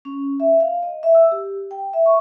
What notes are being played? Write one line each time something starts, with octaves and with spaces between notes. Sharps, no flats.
C#4
E5
F5
D#5
E5
E6
G4
G5
E5
C#6